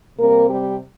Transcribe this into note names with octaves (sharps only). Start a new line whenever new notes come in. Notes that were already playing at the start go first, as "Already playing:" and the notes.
C3 G3 A#3 C4 A#4
G3 G4